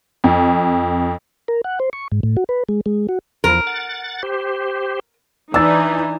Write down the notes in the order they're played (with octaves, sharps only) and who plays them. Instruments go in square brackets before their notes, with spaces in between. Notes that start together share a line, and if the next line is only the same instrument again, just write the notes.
[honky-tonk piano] F2
[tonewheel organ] A#4
F#5
C5
C#6
G#2
A2
F#4
B4
G#3
G#3
F#4
[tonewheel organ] E2 F3 [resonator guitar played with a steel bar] A#4
[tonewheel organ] F#5 A6
G4 C5
[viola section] E3 D#4 [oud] D4 [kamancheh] G#5 A#5 [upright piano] E6 A6